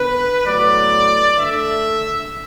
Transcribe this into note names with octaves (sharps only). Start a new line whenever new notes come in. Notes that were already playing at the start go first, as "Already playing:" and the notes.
Already playing: D3 B3 B4
A2 F#3 B3 D5
D3 A3 E5